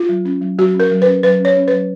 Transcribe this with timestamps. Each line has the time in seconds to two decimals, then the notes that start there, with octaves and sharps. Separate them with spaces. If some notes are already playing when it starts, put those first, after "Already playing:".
Already playing: F4
0.09 F#3
0.25 C#4
0.42 F#3
0.59 F#3 F#4
0.74 C#4
0.80 A#4
0.91 F#3
1.02 B4
1.07 C#4
1.23 F#3 B4
1.39 C#4
1.45 C#5
1.57 C#4
1.68 B4
1.73 F#3